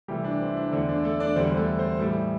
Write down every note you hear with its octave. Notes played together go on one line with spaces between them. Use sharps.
C3 E3 G3 A3 G4
D4
C4
E4
D4
E2 D3 A3 C4
D4
A3 A4
D4 D5
E2 D3 G3 C4 C5
A3 A4
C4 C5
A2 E3 G3 A3 A4